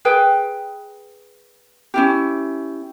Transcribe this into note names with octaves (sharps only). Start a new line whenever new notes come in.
G#4 B4 G5
C#4 E4 G4